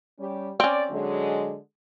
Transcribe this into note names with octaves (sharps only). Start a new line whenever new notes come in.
G3 C#4 G4
C4 C#4 D5
D3 F#3 G#3